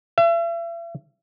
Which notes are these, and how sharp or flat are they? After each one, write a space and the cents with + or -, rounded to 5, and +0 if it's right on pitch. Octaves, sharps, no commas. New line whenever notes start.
E5 +40